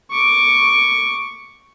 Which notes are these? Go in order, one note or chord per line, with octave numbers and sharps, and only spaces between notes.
C#6 D6